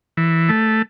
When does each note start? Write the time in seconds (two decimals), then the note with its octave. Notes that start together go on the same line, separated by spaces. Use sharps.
0.17 E3
0.49 A3